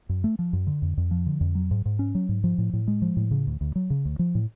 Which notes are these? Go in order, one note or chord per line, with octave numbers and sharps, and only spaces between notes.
F#2
A3
F3
F#2
D3
F2
F2
F3
D3
F2
F#3
G#2
G#2
C#4
F#3
G#2
F3
A2
A2
G#3
F3
A2
C#3
D2
D2
F#3
C#3
D2
F3
A2